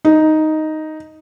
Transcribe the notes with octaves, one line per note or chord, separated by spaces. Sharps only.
D#4